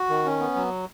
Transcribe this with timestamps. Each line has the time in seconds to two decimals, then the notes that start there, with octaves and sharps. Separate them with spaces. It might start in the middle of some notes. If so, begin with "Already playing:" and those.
Already playing: F#4
0.09 D#3
0.25 C#4
0.40 B3
0.55 F#3